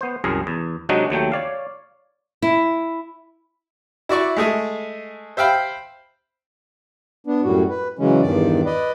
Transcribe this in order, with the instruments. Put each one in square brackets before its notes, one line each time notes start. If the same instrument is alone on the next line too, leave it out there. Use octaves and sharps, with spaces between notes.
[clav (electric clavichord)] B3 C5
C2 F#2 G#4 A#4
E2
C3 F#3 G#3 D4 D#4 F#4
D#2 F#3 A3 G5
C#5 D5 F5
[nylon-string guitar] E4
[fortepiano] E4 F#4 D5 C#6
G#3 A3 G#4
C5 E5 F5 G5 B5
[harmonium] B3 D4
F#2 A2 G3 F#4
B4
C#3 E3 F#3 G#3 C#4
E2 G2 D#3 D5
B4 D5 D#5